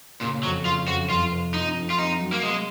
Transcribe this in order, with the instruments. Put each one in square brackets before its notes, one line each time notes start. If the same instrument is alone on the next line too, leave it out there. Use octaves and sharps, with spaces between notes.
[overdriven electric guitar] A#2 [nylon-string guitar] C#3
[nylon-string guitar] F2 [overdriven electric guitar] F#3
[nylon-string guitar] C#3 [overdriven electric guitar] F4
[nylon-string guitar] F2 [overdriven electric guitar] F#4
[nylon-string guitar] F2 [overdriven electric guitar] F4
[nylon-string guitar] C3
[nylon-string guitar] F3 [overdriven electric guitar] D#4
[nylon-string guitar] F2
[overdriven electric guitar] F4
[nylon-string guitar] C4 [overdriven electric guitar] D#4
[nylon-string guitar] F#3
[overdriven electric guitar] A#3
[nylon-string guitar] C3 [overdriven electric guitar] G#3